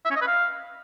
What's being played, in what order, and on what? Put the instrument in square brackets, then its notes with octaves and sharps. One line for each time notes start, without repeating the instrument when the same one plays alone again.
[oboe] E5
C#4
D#5
B4
F5